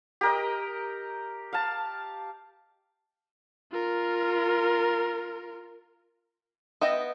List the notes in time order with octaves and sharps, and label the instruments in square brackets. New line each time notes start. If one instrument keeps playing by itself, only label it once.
[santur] G4 A#4 D#5
F5 A5
[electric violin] F4 A#4
[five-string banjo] B3 E5 G5 [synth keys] D#5